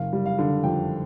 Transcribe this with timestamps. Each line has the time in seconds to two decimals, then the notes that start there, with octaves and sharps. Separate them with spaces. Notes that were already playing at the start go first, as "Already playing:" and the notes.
Already playing: F#1 F5
0.13 G3
0.26 F5
0.39 D3
0.64 F2 G5